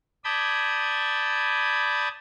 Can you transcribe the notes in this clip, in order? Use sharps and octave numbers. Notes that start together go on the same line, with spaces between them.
D5 A5 B5 D#6 G6 G#6